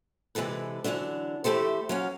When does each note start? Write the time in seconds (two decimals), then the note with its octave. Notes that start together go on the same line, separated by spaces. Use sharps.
0.35 C3 E3 G#3 A4 B4
0.84 D3 E3 F#3 A3 D4
1.44 E3 A3 G4 A4 C5
1.89 F#3 C#4 F5